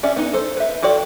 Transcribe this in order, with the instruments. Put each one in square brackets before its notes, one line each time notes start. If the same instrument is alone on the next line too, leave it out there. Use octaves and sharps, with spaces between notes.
[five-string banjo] C#4 D5 E5
B3 D#4
A4 C5
B4 E5
F4 F#4 A4 D5 G5